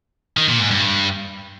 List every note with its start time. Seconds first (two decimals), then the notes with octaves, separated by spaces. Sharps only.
0.37 D#3
0.48 A#2
0.60 G#2
0.71 G2